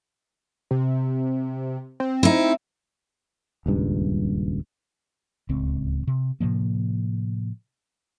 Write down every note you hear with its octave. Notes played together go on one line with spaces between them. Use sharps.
C3
C4
D#4 E4
D#1 C#2 G2
D1 C#2 C4
C3
A2 C3 F3 A#3